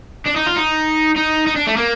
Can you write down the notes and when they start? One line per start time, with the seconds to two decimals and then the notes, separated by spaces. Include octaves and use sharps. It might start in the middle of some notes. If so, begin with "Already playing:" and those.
0.26 D4
0.36 D#4
0.47 F4
0.57 D#4
1.16 D#4
1.47 D#4
1.56 D4
1.67 A3
1.77 A#3